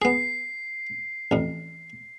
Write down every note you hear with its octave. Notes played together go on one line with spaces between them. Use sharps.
B3 G#4 C7
A1 F2